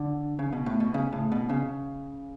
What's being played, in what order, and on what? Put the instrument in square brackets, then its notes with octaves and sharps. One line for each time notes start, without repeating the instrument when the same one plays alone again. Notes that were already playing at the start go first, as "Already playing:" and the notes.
Already playing: [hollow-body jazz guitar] D3
C#3
B2
A2
B2
C#3
A2
B2
C#3